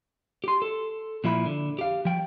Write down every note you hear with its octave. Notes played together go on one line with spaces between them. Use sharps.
G4 C6
A4
A#2 F3 E4 B5
D3
G4 F5
F3 G5